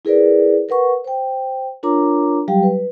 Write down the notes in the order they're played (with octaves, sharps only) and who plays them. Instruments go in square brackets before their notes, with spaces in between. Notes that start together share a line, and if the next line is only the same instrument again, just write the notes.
[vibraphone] E4 G#4 A#4 B4 D5
A#4 B4 F#5 C#6
C5 G5
D4 F4 A#4 C#5 A#5 D6
F#3 G3 G4 F5 G5
B4